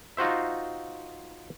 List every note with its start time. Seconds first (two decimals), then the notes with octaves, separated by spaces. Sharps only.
0.17 D#4 F4 F#4 C5 E5